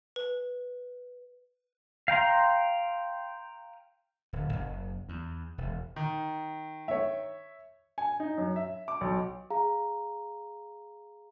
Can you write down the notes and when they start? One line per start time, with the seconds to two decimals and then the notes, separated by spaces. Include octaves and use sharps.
0.16 B4
2.08 F5 G5 A#5 C6
4.33 D1
4.53 F#1
5.09 E2
5.58 E1
5.96 D#3
6.88 C#5 E5
7.98 G#5
8.20 D#4
8.38 F#2
8.56 E5
8.88 D6
9.01 B1
9.50 G#4 F5 A#5